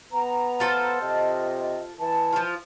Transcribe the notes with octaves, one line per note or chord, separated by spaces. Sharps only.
B3 A#5
F4 A4 C5
C3 D#5
E3 A5
F3 F4